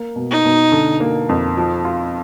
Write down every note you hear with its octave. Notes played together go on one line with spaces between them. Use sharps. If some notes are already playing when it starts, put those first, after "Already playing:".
Already playing: A#3
B2
D#4
B2
D3
A#3
F2
F3
F4